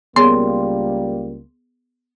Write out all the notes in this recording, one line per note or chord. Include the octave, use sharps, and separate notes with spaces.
C#2 G3 A#3 B3 G#4 C#5 C6